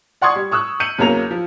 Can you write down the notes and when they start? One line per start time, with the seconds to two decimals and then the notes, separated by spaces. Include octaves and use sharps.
0.22 D5 F#5 C6 C#6 D#6 G#6
0.36 G3
0.51 C#6 D#6 E6 F#6
0.80 G6 C#7 D#7 F#7
0.98 E2 C#3 F#3 A#3 A#5 F7
1.31 F3